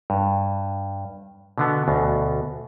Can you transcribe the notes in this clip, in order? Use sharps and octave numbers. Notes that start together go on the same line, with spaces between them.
G2
B2 D3 B3
D2 B2